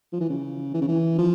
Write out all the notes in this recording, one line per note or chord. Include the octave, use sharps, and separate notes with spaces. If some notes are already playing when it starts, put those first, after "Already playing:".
F3
E3
C#3
E3
C#3
E3
F3